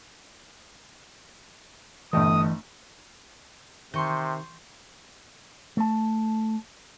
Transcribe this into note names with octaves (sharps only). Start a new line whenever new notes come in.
G1 E3 A3 D#5 G5 D#6
C3 D#3 C6 C#6 G6
A3 A5